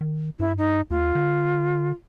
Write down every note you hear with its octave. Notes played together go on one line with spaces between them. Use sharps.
D#3
G2 E4
D#4
D#2 F4
D3